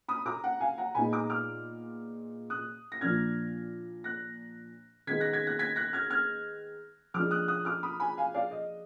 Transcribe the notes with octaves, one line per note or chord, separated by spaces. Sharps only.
B5 D#6
A#5 D6
F#5 A#5
F5 G#5
F#5 A#5
A#2 G#3 B3 D#4 G#5 B5
A#5 D6
D6 F6
D#6 F#6
A#6
A#2 F3 A#3 D4 F6 G#6
F#6 A#6
D#3 G#3 B3 D#4 G#6 B6
F#6 A#6
G#6 B6
F#6 A#6
G#6 B6
F#6 A#6
F6 G#6
F6 G#6
F3 G#3 D4 D6 F6
D#6 F#6
D#6 F#6
D6 F6
B5 D#6
G#5 B5
F5 G#5
D5 F5
D#5